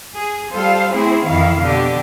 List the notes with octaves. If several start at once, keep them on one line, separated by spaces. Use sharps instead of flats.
G#4
G3 F4 A4 C5 F5
A3 C4 E4 G#4 C5
F2 D#3 E3 E4 F5
B2 D3 G4